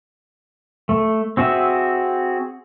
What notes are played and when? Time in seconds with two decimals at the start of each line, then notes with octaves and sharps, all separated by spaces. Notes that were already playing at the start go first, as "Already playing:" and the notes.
0.89 A3
1.37 C4 F#4 G#4 E5